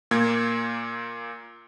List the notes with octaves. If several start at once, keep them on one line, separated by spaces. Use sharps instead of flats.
A#2 A#3 G#6